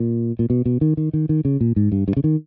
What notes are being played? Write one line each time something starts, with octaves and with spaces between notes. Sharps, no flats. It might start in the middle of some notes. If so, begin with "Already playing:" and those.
Already playing: A#2
A#2
B2
B2
D#3
D#3
D#3
D#3
C#3
A#2
G#2
G2
G2
C#3
D#3